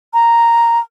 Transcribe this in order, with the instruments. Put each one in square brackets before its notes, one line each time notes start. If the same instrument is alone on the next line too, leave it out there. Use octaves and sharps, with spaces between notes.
[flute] A#5